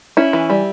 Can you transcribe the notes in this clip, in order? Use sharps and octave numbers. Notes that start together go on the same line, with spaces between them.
C#4 E4
E3
G3